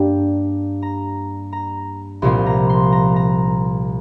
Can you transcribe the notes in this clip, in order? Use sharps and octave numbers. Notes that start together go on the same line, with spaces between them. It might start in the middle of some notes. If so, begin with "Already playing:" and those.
Already playing: G2 G3 A#3 D4 G5
A#5
A#5
C2 A#2 F3 C4 C6
A#5
C6
A#5
A#5